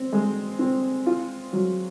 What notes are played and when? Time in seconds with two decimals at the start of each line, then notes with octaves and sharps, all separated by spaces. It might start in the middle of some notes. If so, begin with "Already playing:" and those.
Already playing: C4
0.13 G#3
0.59 C4
1.06 F4
1.53 F#3